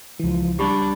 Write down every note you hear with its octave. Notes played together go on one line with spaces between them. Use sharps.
C#2 E3 F3
G3 D4 G4 B5 C#6